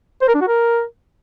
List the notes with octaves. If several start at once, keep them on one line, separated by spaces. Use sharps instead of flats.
C5
A#4
D4
F#4
A#4